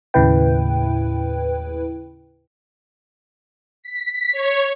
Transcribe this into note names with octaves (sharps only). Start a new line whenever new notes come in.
D#2 A2 C#3 E4 B4 G5
B6
C#5